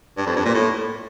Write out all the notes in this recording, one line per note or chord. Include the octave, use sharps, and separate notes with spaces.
G2
F2
G2
A#2
A2